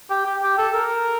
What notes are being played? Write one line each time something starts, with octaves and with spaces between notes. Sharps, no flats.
G4
G4
G4
A4
A#4